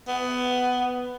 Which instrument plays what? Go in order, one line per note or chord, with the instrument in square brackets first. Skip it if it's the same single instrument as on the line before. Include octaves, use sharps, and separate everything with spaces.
[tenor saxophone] B3